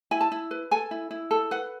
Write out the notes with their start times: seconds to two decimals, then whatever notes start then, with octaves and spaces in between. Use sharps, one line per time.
0.11 E4 G#5
0.21 A5
0.32 E4
0.51 B4
0.71 A4 G#5
0.91 E4
1.11 E4
1.31 A4
1.51 B4 F#5